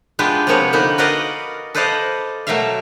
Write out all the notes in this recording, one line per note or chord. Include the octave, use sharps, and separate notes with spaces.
G#3 B3 D4 F4 G4 B4
C3 F3 A#3 B3 C#5
D3 A#3 B3 D#4 B4
F#4 A#4 B4 D5 D#5 F5
A4 B4 C5 D5 D#5 F5
B2 F#3 A3 A#4 E5 F5